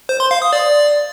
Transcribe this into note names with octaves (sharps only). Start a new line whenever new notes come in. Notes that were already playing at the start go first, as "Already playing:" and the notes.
C5
C6
F5
D#6
D5